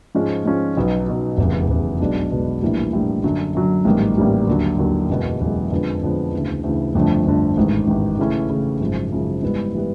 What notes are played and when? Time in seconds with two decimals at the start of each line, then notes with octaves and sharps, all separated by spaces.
0.15 G#2 F3 G#3 C#4 F4
0.45 G#2 F3 G#3 C#4 F4
0.77 B1 B2 F#3 B3 D#4
1.07 B1 B2 F#3 B3 D#4
1.38 F1 E2 C#3
1.69 F1 E2 C#3
2.00 B1 B2 G#3 B3 D4
2.30 B1 B2 G#3 B3 D4
2.62 A#1 A2 E3 G3 A#3
2.93 A#1 A2 E3 G3 A#3
3.24 F#2 D3 F#3
3.55 F#2 D3 F#3
3.85 A1 G#2 D#3 G3 A#3
4.17 A1 G#2 D#3 G3 A#3
4.47 D#2 D3 F#3
4.78 D#2 D3 F#3
5.09 F#1 E2 B2 G#3
5.40 F#1 E2 B2 G#3
5.71 F2 D3 F3 G#3 B3
6.03 F2 D3 F3 G#3 B3
6.33 D2 C#3 E3
6.63 D2 C#3 E3
6.95 G1 F2 D3 F3 A3
7.26 G1 F2 D3 F3 A3
7.57 A1 G#2 D#3
7.87 A1 G#2 D#3
8.18 C#3 E3 A3 C#4 E4
8.49 C#3 E3 A3 C#4 E4
8.81 G#1 F#2 C#3 F3
9.12 G#1 F#2 C#3 F3
9.42 G#2 E3 G3 B3
9.75 E3 G3 B3